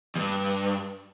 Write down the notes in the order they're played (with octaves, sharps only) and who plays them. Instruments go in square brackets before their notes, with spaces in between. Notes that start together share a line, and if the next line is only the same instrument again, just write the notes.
[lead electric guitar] E2 G2